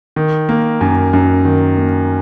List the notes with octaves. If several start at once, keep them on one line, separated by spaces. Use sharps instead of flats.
D#3
A#3
F#2
F#2
D#3
A#3